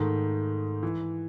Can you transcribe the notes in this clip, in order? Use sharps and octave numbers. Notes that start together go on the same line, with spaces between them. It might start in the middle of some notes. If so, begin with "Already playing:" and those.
Already playing: G#2 D#3 A3
E3